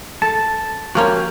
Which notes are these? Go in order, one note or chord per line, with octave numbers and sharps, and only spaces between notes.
A4 A5
F3 A#3 C#4 F#4 G4